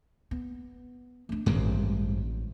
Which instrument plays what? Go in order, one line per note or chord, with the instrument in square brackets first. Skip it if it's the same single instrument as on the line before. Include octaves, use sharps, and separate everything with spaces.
[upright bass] B3
A3 D4
[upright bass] A1 D#3 [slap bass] G2 G#3 C4